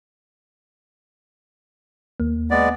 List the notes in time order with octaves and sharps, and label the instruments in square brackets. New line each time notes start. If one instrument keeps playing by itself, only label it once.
[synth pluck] D#2 A#3
[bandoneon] G#3 B3 D5